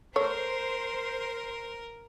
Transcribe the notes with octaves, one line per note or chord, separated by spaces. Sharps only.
A3 A#4 C5 C#5